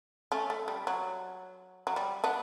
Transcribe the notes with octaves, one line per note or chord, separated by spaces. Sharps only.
A3 C#4
A3
G3
F#3
F#3
G3
B3 D4